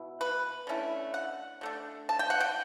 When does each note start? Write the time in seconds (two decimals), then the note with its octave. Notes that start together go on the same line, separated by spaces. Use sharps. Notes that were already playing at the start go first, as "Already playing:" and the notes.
Already playing: B2 E4
0.21 B4
0.67 D3 A3 C#4 E4
1.14 F#5
1.61 D3 A3 D4
2.09 A5
2.19 G5
2.30 F#5
2.40 G5